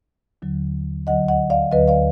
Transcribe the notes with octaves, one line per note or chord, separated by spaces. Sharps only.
D#2 D3 F#3
D2 D3 F#3 D#5 F#5
D#5 F#5
D5 F5
D2 D3 F#3 B4 D#5
D5 F5